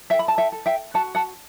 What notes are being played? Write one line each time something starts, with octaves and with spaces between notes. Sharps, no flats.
A4 E5 G5
B5
A5
E5 G5
A4
E5 G5
F#4 F#5 A5
F#5 A5